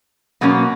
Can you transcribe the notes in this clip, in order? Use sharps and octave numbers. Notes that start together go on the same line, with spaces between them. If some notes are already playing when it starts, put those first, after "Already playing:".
B2 F#3 A#3 C#4